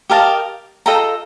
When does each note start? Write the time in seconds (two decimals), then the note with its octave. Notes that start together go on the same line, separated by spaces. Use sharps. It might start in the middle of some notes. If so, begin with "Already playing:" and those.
0.10 G4 A#4 D#5 F5 A5
0.86 F4 A4 D#5 G5 A#5